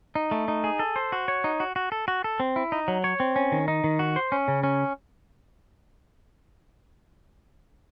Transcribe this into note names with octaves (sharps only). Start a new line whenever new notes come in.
D#4
A3
D#4
G#4
A4
C5
F#4
C#5
D#4
F#4
F#4
A4
F#4
A4
C4
E4
D#4
F#3
C#5
C4
C#4
D#3
D#4
D#3
F#4
C5
C#4
C#3
C#4